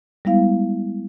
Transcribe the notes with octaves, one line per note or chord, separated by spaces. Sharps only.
G3 G#3 B3 E4 F5